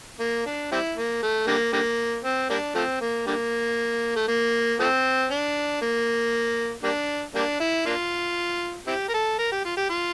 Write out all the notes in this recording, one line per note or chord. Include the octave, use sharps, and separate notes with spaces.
A#3
D4
G3 C4 E4
A#3
A3
D3 G3 A#3
D3 G3 A#3
C4
G3 A#3 D4
F3 A3 C4
A#3
D3 G3 A#3
A3
A#3
F3 A3 C4
D4
A#3
G3 A#3 D4
G3 A#3 D4
E4
A#3 D4 F4
C4 E4 G4
A#4
A4
A#4
G4
F4
G4
F4